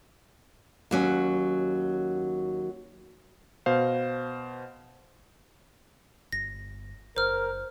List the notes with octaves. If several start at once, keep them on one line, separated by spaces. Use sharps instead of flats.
D#2 F#3 C#4
B2 C5 F5
G1 A#6
F#1 A#4 C5 F6